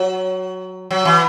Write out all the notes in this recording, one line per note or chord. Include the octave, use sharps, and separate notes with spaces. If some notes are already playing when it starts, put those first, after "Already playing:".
Already playing: F#3
F#3
E3